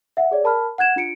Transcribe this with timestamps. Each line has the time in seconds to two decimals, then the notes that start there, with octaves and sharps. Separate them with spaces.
0.17 E5 F#5
0.31 G#4 C#5 D5
0.44 A#4 A5 B5 F6
0.78 F#5 F#6 G#6 E7
0.96 D4 F4 C#7 D7